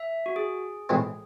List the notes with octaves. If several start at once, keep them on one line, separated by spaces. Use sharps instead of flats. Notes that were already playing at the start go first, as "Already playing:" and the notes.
Already playing: E5
F#4
G#4
A2 E3 G#3 C4